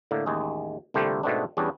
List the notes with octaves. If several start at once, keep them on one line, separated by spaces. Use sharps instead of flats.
A2 D3 A#3
A1 D#2 G#3 G#4
C2 A#2 D3 A3 G4 C5
G#2 B2 A3 B3 C4 D4
E2 G3 B3 C#4 D4